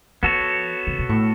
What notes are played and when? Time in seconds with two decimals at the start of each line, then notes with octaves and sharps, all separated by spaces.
0.23 F3 B3 F#4 A4 C#5
0.87 C#3
0.98 B2
1.09 A2